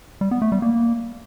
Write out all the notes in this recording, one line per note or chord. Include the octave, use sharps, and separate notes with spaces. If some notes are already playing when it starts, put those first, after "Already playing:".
G3
B3
A3
G3
A#3